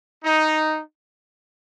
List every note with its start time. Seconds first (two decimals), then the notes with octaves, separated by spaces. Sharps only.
0.25 D#4